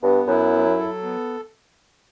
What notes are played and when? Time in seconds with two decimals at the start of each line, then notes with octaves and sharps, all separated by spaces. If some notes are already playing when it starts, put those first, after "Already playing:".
0.03 G2 B3
0.27 F#2 E4
0.54 F#3
0.79 A4
1.03 B3